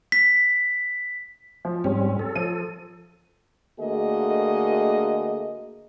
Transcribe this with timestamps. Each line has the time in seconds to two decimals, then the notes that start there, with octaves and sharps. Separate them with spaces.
0.12 B6
1.65 F3
1.84 G#2 G3 C4 C#4
2.19 A4
2.36 F3 D#7
3.80 D3 A3 A#3 F#4 G#4 D#5